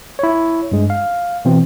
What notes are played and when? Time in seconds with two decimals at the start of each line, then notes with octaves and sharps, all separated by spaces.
0.19 E4 C#5
0.72 G2 G#3
0.90 F5
1.45 B2 E3 C4